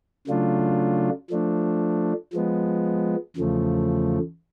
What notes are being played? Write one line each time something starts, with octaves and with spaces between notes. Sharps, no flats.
C#3 F#3 A3 D4 F4
F3 A3 D4
F3 G#3 B3
E2 C#3 F3 A3